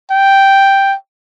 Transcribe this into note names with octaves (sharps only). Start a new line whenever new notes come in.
G5